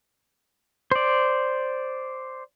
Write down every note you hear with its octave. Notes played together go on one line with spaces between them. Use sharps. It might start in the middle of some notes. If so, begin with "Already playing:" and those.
C5 D5